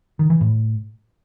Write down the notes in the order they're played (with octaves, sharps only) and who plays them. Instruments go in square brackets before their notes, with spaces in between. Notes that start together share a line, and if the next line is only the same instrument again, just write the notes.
[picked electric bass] D#3
E3
A2